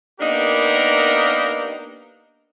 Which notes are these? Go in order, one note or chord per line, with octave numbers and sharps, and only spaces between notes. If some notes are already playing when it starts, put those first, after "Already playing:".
A#3 B3 D4 D#4 G4 A#4